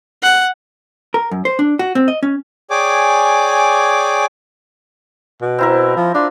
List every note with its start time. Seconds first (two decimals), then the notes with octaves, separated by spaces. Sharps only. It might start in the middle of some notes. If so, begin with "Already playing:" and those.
0.23 F#5
1.14 A#4
1.31 F#2
1.45 C5
1.59 D4
1.79 F#4
1.95 C4
2.08 D#5
2.23 C#4
2.70 G#4 C#5 D5 G5 G#5 D6
5.42 B2
5.59 C4 E4 A#4
5.96 F3
6.15 D4 F4